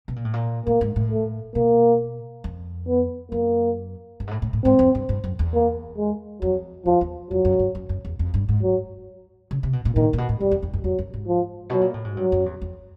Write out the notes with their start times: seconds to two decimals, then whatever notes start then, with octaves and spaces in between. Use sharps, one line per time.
0.08 B2
0.16 A#2
0.25 A2
0.33 A#2
0.66 A2 A#3
0.81 G#2
0.96 A2
1.11 A3
1.55 B2 A#3
2.44 F2
2.88 B3
3.31 F#2 A#3
4.20 G2
4.27 G#2
4.31 A2
4.42 A2
4.53 A2
4.64 G#2 C4
4.79 F2
4.95 G2
5.09 G2
5.24 F#2
5.39 E2
5.54 A#3
5.98 G#3
6.41 F2 F#3
6.86 E2 F3
7.01 E2
7.31 F2 F#3
7.45 F#2
7.59 G2
7.75 F#2
7.89 F#2
8.05 E2
8.19 F2
8.34 G2
8.49 G#2
8.63 F#3
9.51 C#3
9.63 C3
9.73 B2
9.85 A#2
9.95 A#2 D#3
10.13 A#2
10.18 B2
10.29 A2
10.40 F2 G3
10.51 F2
10.62 F2
10.73 F#2
10.84 F2 F#3
10.99 F#2
11.14 G#2
11.28 F3
11.70 B2 F#3
11.81 A#2
11.94 A2
12.04 G#2
12.17 G2 F#3
12.32 F#2
12.46 E2
12.62 F2